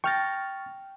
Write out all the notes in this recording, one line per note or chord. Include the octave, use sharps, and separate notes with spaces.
G5 C#6 F6 A6 A#6